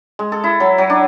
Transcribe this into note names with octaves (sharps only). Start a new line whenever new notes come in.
G#3
A4
E4
F#3
F#3
D4